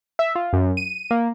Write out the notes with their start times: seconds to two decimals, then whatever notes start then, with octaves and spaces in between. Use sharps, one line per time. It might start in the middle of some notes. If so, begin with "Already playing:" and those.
0.19 E5
0.35 F4
0.53 F#2
0.77 D#7
1.11 A#3